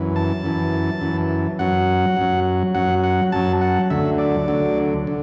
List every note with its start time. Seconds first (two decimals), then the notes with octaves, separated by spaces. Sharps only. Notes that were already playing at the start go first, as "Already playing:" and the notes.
Already playing: F#2 E3
0.16 A5
0.44 F#2 E3
1.01 F#2 E3
1.59 F#2 F#3 F#5
2.17 F#2 F#3
2.74 F#2 F#3 F#5
3.04 F#5
3.32 F#2 F#3 A5
3.61 F#5
3.90 D2 D3 F#3 E5
4.18 D5
4.48 D2 D3 F#3
5.07 D3